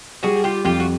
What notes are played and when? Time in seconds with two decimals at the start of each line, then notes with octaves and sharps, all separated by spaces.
0.23 G3 F#4 G#4
0.44 F4 G4
0.65 F2 F4 G4
0.80 F#4